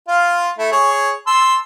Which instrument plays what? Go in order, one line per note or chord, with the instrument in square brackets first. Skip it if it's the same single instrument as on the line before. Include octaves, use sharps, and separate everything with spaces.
[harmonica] F4 F5
A3 E4
G#4 C#5
A5 C6 E6